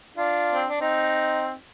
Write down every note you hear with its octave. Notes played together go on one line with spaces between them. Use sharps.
D4 F4
C4
D4
C4 D#4